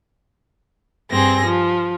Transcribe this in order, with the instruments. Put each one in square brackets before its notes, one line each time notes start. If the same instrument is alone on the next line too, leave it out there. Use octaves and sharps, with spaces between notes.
[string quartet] G2 C4 G#4 A#6
F3